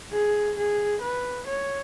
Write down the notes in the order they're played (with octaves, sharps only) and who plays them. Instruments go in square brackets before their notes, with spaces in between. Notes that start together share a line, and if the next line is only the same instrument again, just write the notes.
[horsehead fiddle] G#4
G#4
B4
C#5